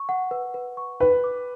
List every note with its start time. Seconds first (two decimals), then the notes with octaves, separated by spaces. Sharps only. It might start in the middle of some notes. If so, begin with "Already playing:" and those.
Already playing: C#6
0.09 F#5
0.31 B4
0.54 B4
0.77 C#6
1.00 B4 G5
1.24 D6